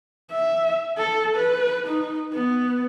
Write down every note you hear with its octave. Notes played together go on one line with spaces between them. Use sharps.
E5
A4
B4
D#4
B3